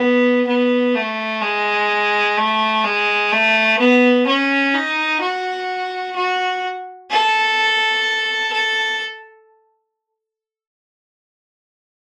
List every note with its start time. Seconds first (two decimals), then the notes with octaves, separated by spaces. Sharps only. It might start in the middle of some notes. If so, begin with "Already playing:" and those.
Already playing: B3
0.47 B3
0.95 A3
1.42 G#3
2.37 A3
2.84 G#3
3.32 A3
3.79 B3
4.27 C#4
4.74 D#4
5.21 F#4
6.16 F#4
7.11 A4
8.52 A4